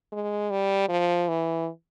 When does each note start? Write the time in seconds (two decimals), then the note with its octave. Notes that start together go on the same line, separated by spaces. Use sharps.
0.12 G#3
0.51 G3
0.89 F3
1.28 E3